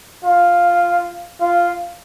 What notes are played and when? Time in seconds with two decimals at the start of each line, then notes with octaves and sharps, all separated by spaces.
0.25 F4
1.41 F4